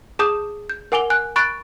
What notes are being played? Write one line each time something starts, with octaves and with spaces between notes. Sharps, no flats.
G#4 A5 D6 D#6 G6 E7
G6
A#4 F#5 G#5 D6 F7 G7
G#5 F#6
B5 C#6 F#6 A6 D7